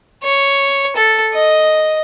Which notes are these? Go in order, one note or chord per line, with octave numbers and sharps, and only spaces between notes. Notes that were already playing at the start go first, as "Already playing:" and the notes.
C#5
A4
D#5